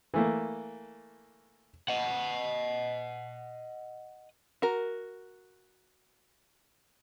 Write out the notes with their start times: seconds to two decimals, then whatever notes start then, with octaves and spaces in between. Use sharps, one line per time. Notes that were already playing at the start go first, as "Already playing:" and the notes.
0.14 E3 A3 A#3
1.88 D#5 F#5
4.62 F#4 A#4